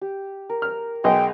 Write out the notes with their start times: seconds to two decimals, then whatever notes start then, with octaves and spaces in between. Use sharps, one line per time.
0.01 G4
0.49 A#4
0.62 F6
1.04 B1 G#3 D#5 G5